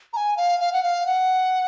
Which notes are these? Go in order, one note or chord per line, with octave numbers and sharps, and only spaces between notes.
A#5
G#5
F5
F5
F#5
F5
F#5